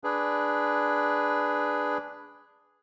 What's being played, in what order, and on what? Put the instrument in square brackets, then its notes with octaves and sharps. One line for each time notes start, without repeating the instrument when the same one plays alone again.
[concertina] D4 G#4 B4